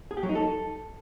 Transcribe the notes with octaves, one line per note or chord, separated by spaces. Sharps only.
G#4
G4
F#3
D#4
A4